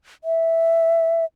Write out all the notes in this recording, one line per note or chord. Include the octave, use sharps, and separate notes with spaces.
E5